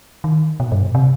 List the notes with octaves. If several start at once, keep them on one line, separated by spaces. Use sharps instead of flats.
D#3
B2
G2
B2
C3